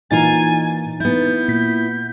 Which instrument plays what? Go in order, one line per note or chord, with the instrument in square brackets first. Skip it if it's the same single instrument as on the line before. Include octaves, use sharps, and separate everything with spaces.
[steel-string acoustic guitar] A#2 F4 A#5 [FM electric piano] E3 D#4 A6 [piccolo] G#5
[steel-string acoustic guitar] B3 E4 [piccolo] G6
[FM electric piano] A#2 B6